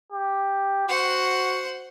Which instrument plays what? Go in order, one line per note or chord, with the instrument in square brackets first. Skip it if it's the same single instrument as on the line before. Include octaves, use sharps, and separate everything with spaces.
[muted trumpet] G4
[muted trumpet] F#4 [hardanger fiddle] C5 F#5